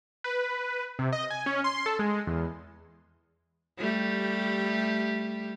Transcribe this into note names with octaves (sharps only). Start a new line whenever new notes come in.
B4
C3
D#5
G#5
C#4
C6
A4
G#3
E2
G3 A3 G4